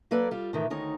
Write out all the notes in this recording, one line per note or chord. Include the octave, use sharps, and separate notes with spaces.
F#3 A#3 A4 B4 D5
G3 F4
A2 D#3 E3
D2 D#3 D#4 C#5